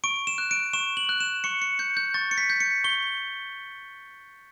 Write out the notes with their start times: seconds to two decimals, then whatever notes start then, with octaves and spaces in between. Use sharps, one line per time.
0.04 C#6 D7
0.27 E7
0.38 F#6
0.51 D7
0.73 C#6 E7
0.97 F#7
1.09 F#6
1.20 E7
1.44 C#6 C#7
1.62 C#7
1.79 G6 C#7
1.97 G6
2.14 C#6 A6
2.31 C#7
2.38 B6
2.50 G6
2.60 C#7
2.84 C#6 G7